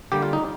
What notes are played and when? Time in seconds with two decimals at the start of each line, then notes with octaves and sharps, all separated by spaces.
0.12 D3 G3 A#3 G4
0.23 F4
0.33 D#4